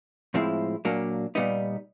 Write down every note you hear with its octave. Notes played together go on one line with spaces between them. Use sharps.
A2 F3 G#3 C4 E4
A#2 F#3 A#3 D4
A#2 G3 B3 D#4